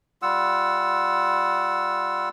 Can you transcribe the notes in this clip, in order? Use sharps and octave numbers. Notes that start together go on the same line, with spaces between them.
G3 F4 F#5 E6